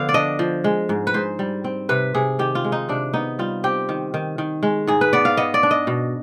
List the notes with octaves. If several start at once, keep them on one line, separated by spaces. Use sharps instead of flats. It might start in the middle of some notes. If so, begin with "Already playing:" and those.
Already playing: D3 F3 B3 F5
D5
D4 D#5
F3
G#3
G#2
B4
G#2 C5
G3
C4
C3 B4
C3 G#4
D#3 G4
F4
G#3
D#4
C3 D4
B3 D#4
G3 F4
C4 G4
D#3
D#3
D#3
G#3
G#2 G#4
B4
B3 D5
F5
B3 D#5
D5
D4
D#5
B2